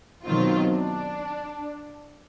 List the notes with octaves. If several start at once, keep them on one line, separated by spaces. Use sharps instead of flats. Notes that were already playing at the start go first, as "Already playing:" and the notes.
B2 D#3 F#3 C4 F4
D4